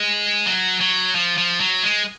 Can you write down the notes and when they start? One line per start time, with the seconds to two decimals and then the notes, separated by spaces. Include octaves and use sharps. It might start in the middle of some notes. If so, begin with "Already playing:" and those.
Already playing: G#3
0.46 F#3
0.81 F#3
1.15 F3
1.38 F3
1.60 F#3
1.83 G#3